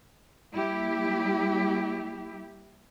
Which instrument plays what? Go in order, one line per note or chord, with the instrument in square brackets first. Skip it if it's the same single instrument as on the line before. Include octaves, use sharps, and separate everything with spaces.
[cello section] G3 A#3 E4 G4